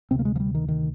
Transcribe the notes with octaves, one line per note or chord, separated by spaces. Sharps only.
D2 C3 C4
A#3
G#3
F3
G3
D#3
D#3